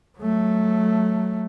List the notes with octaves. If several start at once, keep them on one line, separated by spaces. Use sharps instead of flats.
F#3 A3